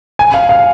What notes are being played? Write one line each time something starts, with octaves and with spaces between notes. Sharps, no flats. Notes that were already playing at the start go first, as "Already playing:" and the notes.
G#5
F5
F5